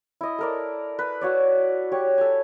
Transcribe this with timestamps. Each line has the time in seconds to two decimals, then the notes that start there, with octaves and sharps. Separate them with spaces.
0.21 E4 D#5
0.39 A4 A#4 D5
0.99 B4
1.21 F#4 C#5 D5
1.92 G4 C#5
2.18 A4 G#5